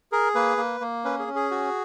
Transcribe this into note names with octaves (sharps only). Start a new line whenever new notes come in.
G#4 A#4
A#3 B4
A#3
A#3
C#4 B4
G#4
C#4
G#4
F#4